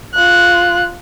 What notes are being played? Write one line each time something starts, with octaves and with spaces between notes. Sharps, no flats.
F4 F#6